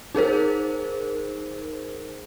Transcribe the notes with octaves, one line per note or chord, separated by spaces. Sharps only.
D#4 G#4 A#4 C5